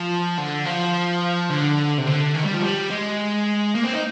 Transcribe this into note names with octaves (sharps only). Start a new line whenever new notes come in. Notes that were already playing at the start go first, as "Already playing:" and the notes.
Already playing: F3
D3
F3
D3
C3
D3
D#3
G3
F3
G3
G#3
A#3
C4
D#4